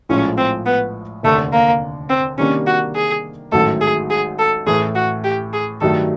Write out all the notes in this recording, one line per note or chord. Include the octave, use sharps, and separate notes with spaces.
A#1 A2 F3 G#3 C#4
C4
B3
F1 D#2 D3 A3
A#3
C4
C3 D#3 G3 A#3 C#4 D4
F#4
G#4
A1 G#2 D#3 F#3 A3 A4
G#4
G#4
A4
A2 E3 A3 G#4
F#4
G4
G#4
G2 D#3 F#3 A3 A4